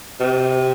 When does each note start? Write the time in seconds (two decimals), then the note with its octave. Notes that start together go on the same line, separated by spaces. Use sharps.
0.20 C3